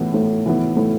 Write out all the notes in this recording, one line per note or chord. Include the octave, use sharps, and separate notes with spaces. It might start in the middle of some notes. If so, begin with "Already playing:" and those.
Already playing: A2 E3 B3 E4
A2
E3 B3 E4
A2